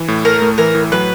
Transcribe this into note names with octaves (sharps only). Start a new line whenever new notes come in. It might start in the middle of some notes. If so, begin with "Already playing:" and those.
Already playing: E3
A2
A3 A#4
A2
E3 A#4
A2
F#3 B4